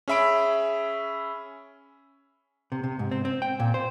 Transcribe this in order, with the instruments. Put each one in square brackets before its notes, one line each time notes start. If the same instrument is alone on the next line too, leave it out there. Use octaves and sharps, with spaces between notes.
[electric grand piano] C#4 G#4 E5 B5 D7
[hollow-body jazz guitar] C3
C3
G#2
C4
C4
G5
A#2
C5